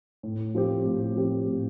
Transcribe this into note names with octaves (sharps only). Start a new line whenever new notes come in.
A2
F3 C4 G4
A2
F3 C4 G4
A2